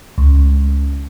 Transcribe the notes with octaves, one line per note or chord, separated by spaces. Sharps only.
C#2